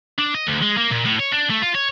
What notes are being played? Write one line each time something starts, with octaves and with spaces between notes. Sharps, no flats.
D4
D#5
D2
G#3
A#3
A#2
A2
C#5
D4
A3
F4
C#5